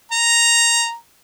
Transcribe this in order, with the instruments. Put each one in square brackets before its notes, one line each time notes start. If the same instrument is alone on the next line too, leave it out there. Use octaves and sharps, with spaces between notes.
[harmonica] A#5